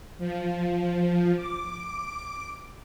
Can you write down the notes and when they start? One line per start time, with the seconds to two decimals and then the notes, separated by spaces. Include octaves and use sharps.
0.18 F3
1.35 D6